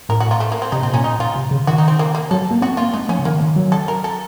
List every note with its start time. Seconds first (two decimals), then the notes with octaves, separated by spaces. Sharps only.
0.09 A2 A#4
0.20 F#4
0.31 F4
0.40 A3
0.52 A#3
0.62 C4
0.72 C3 D#4
0.82 A#2 C4
0.93 A#2 C#4
1.04 A#2 D#4
1.19 A#2 F4
1.36 C3
1.51 C#3
1.67 D#3 F#4
1.78 D#4
1.88 C4
1.99 A#3
2.15 A#3
2.31 F#3 A4
2.51 A#3
2.62 C4 F#4
2.77 A#3 F4
2.93 A3 D#4
3.09 F3 C#4
3.19 C#3
3.25 D#3 A#3
3.41 D#3
3.56 F#3
3.72 A4
3.88 A#4
4.04 A4